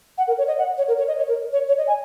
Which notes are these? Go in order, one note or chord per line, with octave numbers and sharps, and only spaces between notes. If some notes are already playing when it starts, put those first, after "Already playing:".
F#5
A#4
C#5
D#5
F#5
C#5
A#4
C#5
D#5
C#5
A#4
C#5
C#5
D#5
G#5